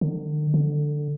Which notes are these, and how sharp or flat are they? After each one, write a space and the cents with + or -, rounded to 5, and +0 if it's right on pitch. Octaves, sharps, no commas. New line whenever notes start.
D3 +45
D3 +10